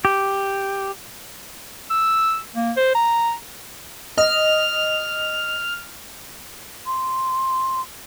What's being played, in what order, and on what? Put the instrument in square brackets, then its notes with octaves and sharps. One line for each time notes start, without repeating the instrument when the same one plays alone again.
[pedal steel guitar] G4
[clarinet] E6
A#3
C5
A#5
[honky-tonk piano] D#5 [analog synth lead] F6
[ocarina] C6